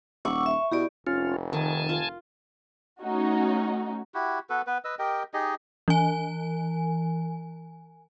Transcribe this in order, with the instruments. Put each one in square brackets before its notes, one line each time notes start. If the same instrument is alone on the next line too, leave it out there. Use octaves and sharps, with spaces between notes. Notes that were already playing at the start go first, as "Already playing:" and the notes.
[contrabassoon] D#1 [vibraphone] F#5 D6 E6 [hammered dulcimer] C#6
[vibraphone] E5
[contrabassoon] B2 [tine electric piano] E4 [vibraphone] G4 D5
[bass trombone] F1 [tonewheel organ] C#4 F4
[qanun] D#3 [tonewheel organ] G#5 A5
[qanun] F4
[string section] A3 C#4 D#4 F#4
[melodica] E4 F#4 G4
B3 F#4 A4 B4
B3 B4
B4 D#5 E6
G4 A#4 D#5 G5
D#4 G4 G#4 D#5
[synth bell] E3 G#5